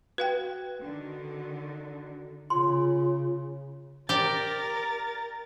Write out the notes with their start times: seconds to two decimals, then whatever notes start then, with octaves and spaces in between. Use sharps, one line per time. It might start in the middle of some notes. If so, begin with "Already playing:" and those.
0.18 F#4 B4 F5 G5
0.82 D3 D#3
2.50 C#3 F4 C6
4.09 G4 A#4 D5 A6